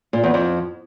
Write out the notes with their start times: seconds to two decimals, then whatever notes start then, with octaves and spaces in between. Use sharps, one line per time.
0.13 A#2
0.24 E2
0.34 F2